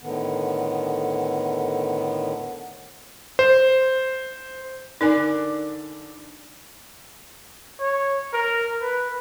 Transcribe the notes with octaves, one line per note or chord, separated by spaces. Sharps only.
A2 D3 D#3 B3
C5
D3 D4 D#4 A#4 D5 G#5
C#5
A#4
B4